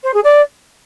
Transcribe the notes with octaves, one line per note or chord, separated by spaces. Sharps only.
C5
G#4
D5